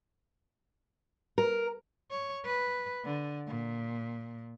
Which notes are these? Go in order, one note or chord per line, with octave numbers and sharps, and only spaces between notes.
A#4
C#5
B4
D3
A#2